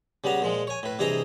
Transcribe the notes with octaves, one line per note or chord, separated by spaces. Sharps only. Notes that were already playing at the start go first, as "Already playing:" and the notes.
C#3 G3 B3 A#5
A#2 F3 G#3
C#5 G#5
A2 B4
G2 C3 E3 G#4 D#5 A#5